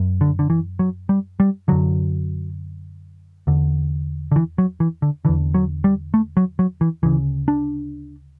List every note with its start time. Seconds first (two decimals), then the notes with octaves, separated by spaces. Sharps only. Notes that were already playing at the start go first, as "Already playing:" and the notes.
Already playing: F#2
0.21 D3
0.39 D3
0.50 E3
0.79 F#3
1.09 G3
1.40 G3
1.68 F#2 D3 F#3
3.47 E2 D3
4.32 D3
4.36 E3
4.58 F#3
4.80 E3
5.02 D3
5.25 E2 D3 E3
5.54 F#3
5.84 G3
6.14 A3
6.37 F#3
6.59 F#3
6.81 E3
7.03 D2 C#3 E3
7.48 D4